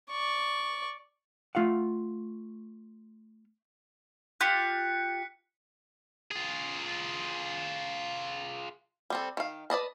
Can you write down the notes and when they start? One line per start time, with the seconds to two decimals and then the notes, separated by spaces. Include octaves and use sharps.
0.10 D5 C#6
1.55 A3 F4 F5 F#5
4.41 F4 G4 F#6 B6 C#7
6.31 F4 G#4
9.10 G3 C4 A4
9.37 D#3 F5
9.70 B4 D5 D#5 A5